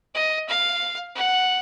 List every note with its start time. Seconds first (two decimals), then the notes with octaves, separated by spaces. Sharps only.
0.15 D#5
0.49 F5
1.15 F#5